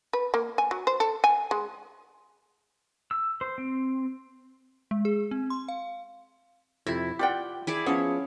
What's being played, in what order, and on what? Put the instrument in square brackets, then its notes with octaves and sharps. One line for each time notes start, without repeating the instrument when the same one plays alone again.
[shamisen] B4
A#3
G#5
F#3
C5
A4
G#5
G#3
[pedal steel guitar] E6
C5
C4
[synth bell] G#3
G#4
C4
C6
F5
[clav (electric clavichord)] F2 C3 [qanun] E4
[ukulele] F4 D5 G5 [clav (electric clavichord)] G4 F#5
[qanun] E4 G#4 D5
[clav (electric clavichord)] F3 B3 [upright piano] C#4 [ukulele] G#4 [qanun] C#5